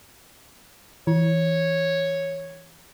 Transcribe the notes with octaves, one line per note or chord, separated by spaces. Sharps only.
E3 C#5